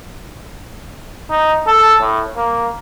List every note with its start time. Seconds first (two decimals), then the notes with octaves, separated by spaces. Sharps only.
1.30 D#4
1.67 A4
2.01 A2
2.37 A#3